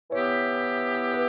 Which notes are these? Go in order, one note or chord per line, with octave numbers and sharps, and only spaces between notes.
E3 B3 E4 G4 C#5
B4